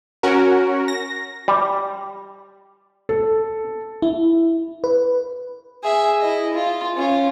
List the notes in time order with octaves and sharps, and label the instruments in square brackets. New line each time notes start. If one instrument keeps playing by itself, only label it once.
[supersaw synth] C#4 F#4 A#4
A#6
[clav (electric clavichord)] G3
[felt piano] A4
[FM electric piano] E4
B4
[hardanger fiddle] G#4 E5
E4 D#5
F4
C#4 F4